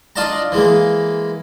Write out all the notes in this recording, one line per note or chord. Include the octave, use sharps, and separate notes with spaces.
D4 F4 D5 D#5 A5 A#5
E3 G#3 A#3